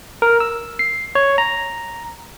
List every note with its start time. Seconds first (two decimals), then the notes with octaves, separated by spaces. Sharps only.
0.22 A#4
0.40 E6
0.79 C7
1.15 C#5
1.38 A#5